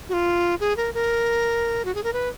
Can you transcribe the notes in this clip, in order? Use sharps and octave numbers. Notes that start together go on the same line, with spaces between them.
F#4
F4
G#4
A#4
A#4
F#4
G#4
A#4
B4